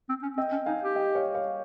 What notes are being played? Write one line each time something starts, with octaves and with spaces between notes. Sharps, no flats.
C4
C#4
C4 D#5 G5
C#4
D#4 F5 G#5
G4
D#5 G5
C#5 F5
C#5 F5